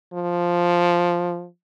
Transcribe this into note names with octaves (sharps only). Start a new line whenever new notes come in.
F3